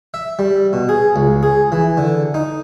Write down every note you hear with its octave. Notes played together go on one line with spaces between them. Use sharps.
E5
G3
B2
G#4
C#2
G#4
E3
D3
D#4